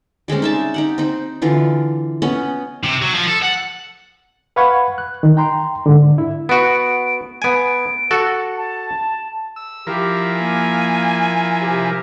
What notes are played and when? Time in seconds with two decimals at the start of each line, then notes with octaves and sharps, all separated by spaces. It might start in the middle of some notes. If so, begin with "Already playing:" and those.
0.28 G3 G#3 C4 C#4
0.42 D#4 E5 A5
0.74 D#4 G4 F#5
0.98 C4 D#4
1.42 D3 E3 F4
2.22 B3 C#4 B4 D#5
2.84 C3
3.02 F#3
3.14 F3
3.27 A4
3.42 F#5
4.56 B4 F5 F#5 B5 C#6 G#6
4.98 F#6
5.23 D#3
5.37 G5 A#5 C6
5.86 G#2 D3
6.18 E4
6.49 B3 F#4 D7
7.42 B3 G#5 D7
8.11 F#4 A4
8.56 A5
9.56 E6
9.87 F3 E4 G4 A#4
10.38 A#3 G#5
11.62 C3 G4